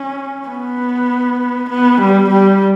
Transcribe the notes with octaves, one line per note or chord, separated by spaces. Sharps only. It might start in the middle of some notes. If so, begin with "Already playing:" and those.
Already playing: C#4
B3
B3
G3
G3